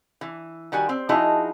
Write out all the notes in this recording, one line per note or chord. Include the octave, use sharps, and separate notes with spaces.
E3
D#3 G3 F#4 G#5
C4
F3 D#4 E4 F#4 G#4